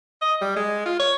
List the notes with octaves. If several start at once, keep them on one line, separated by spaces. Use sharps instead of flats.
D#5
G3
G#3
F4
C#5